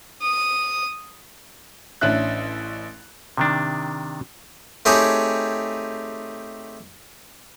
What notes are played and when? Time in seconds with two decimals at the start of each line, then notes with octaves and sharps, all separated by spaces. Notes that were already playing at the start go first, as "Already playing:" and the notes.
0.22 D#6
2.01 A1 C#4 D4 E5 F#6
3.37 C3 D#3 D4
4.85 A3 C4 D#4 G4 G#4 C#5